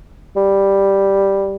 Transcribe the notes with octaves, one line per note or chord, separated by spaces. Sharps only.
G3